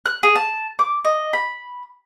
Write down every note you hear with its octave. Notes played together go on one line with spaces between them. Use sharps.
F#6
G#4
A5
D6
D#5
B5